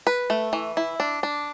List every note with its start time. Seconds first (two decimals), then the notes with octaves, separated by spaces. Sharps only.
0.07 B4
0.30 A3
0.53 E3
0.77 E4
1.00 D4
1.23 D4